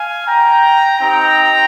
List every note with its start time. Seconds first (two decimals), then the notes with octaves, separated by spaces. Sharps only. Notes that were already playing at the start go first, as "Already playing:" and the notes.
Already playing: F5 G#5
0.27 G5 A#5
0.98 C4 D#4 G4 G5 A#5